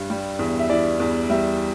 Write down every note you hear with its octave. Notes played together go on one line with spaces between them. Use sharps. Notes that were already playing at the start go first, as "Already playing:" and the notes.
Already playing: G2
G3
E2
E5
E3 D5
E2
G3 E5